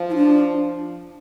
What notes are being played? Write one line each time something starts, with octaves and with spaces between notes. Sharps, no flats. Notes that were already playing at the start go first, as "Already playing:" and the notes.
Already playing: F3
E4
D4